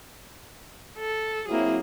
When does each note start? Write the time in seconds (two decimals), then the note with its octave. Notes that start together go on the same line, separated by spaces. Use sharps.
0.98 A4
1.48 F#3 A#3 C4 E4 G#4